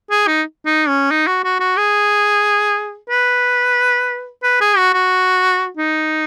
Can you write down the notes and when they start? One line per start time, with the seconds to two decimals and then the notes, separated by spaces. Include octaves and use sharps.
0.11 G#4
0.27 D#4
0.66 D#4
0.88 C#4
1.11 D#4
1.27 F#4
1.44 F#4
1.60 F#4
1.77 G#4
3.10 B4
4.43 B4
4.61 G#4
4.77 F#4
4.93 F#4
5.77 D#4